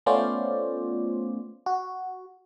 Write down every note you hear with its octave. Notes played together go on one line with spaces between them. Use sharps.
A3 B3 C#4 F4 C5 D5
F#4